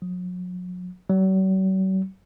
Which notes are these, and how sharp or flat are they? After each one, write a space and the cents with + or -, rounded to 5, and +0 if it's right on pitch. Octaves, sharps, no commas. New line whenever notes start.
F#3 -40
F#3 +45